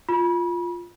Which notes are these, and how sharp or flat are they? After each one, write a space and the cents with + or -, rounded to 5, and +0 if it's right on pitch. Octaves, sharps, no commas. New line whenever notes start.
F4 +0 B5 -35